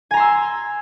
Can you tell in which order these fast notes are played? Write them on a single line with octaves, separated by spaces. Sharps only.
G#5 A#5 C6 E6